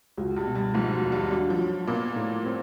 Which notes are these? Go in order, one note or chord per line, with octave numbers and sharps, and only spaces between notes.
C#2 F#3
G2 G3
B2
G2 G3
G#2 F3 G#3
F#3
D#2
G2 G3
F#3 D4
F3
F#3
A#2 A#3 B3
A2
C4